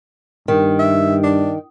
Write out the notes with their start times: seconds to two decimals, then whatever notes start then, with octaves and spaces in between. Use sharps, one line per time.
0.48 G2 D#3
0.79 E5
1.24 D4